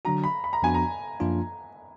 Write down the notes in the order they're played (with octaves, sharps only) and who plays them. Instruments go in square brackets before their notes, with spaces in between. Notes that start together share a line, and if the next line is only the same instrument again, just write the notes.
[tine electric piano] D3 F#3 D4 F#4 [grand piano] A#5
[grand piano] B5
B5
A#5
[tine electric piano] F2 F3 B3 D4 F#4 [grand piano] G#5
[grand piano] A#5
[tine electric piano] F#2 F3 A#3 D4 F4